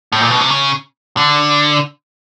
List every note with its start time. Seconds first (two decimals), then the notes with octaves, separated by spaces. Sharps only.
0.12 A2
0.21 A#2
0.30 B2
0.40 C3
0.50 C#3
1.17 D3